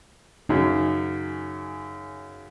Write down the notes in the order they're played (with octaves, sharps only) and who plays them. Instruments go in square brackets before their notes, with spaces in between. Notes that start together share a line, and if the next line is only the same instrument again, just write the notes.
[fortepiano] F#2 C#3 [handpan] D#4